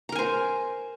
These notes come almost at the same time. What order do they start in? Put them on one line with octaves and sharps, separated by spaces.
A#5 A#4 G#5 C5